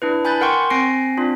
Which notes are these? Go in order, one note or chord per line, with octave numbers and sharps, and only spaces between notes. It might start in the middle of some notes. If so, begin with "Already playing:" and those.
D4 E4 B4
G#5 B5 F#6 G6 A6
A#4 F#5 G5 C6 C#6
C4 G#5 A#6 C7 D7
C4 D4 F4